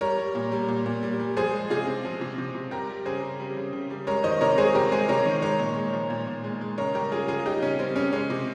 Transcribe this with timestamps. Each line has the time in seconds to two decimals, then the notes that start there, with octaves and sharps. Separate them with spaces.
0.01 G3 A#4 C#5
0.18 G3
0.35 A#2
0.52 G3
0.68 A#2
0.86 A#2
1.03 G3
1.19 G3
1.37 F3 G#4 C5
1.53 G#3
1.70 C3 F4 G#4
1.87 C3
2.05 F3
2.21 C3
2.38 C3
2.55 C3
2.71 G3 G4 A#4
2.88 G3
3.05 C#3 G#4 C5
3.23 C#3
3.40 G3
3.57 C#3
3.73 C#3
3.90 G3
4.07 G#3 A#4 C#5
4.24 D#3 C5 D#5
4.41 C3 A#4 C#5
4.58 G#3 G#4 C5
4.75 C3 G4 A#4
4.91 G#3 G#4 C5
5.08 C3 A#4 C#5
5.26 D#3
5.42 G#3 A#4 C#5
5.59 A#2
5.76 G#3
5.93 F3
6.10 A#2
6.27 A#2
6.44 G#3
6.61 G#3
6.78 C#3 A#4 C#5
6.95 G3 G4 A#4
7.12 C#3 F4 G#4
7.28 C#3 F4 G#4
7.45 G3 D#4 G4
7.62 C#3 C#4
7.79 G3 C4
7.96 C#3 C#4
8.13 G#3 C#4
8.30 C3